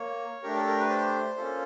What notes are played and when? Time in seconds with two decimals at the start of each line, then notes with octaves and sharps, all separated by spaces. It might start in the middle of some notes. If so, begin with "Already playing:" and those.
Already playing: A#3 C#5
0.43 A3 D4 G4 A#4
0.55 A4
0.67 A#4
0.79 B4
0.90 C5
1.37 A#3 C#4 F4 A4